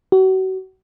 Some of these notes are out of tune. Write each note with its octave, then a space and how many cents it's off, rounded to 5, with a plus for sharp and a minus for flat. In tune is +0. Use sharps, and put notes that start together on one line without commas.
F#4 +35